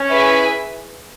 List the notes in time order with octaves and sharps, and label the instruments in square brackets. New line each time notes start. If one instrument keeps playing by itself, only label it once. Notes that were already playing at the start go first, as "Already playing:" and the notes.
Already playing: [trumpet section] C#4
[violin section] E4 G#4 B4 E5 G#5